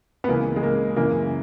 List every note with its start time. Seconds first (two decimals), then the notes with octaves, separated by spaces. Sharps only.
0.24 B3
0.28 C#2 C#3 E3 A#3
0.56 G#3
0.63 A#3
0.96 F#2 C#3 E3 A#3